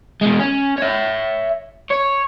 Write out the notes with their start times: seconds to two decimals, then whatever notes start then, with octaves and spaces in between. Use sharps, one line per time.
0.21 B2 G#3
0.40 C#4
0.78 C#5 E5
1.90 C#5